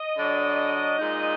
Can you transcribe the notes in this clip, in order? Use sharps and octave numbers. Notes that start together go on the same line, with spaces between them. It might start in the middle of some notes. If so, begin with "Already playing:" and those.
Already playing: D#5
D3 F#3 D4
A#2 G#3 D#4